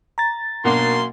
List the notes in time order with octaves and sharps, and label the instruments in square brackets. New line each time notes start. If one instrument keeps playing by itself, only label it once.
[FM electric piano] A#5 A6
[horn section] F#2 C6 [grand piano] B2 D4 [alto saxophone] A#3